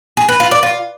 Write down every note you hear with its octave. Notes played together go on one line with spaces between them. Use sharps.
G#4
B4
F4
D5
F4